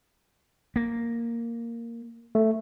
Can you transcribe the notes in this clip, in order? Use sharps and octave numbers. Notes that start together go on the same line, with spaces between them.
A#3
A3